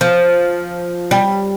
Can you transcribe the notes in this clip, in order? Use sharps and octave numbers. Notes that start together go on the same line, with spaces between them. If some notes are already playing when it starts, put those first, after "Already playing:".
F3
G3